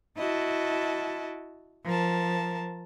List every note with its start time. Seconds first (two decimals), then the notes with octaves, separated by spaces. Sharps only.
0.18 E4 F#4 D#5 A5
1.86 F3 A#4 A5